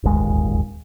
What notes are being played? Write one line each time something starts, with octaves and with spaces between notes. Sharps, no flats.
D1 G1 D#2 G#3